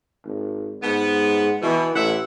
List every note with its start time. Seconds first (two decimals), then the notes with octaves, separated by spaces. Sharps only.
0.25 G#1
0.83 G#2 B3
1.62 B2 E3
1.94 A1 E4 E5 F#5